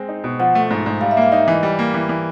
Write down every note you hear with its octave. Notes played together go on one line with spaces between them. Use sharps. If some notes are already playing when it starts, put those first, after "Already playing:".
Already playing: G#3 C4
D#4
B2
F3 F#5
A3
G#2
G#2
G3 F5
E5
A#3 F5
D#4 E5
E3 D#5
G3
A#3
E3
E3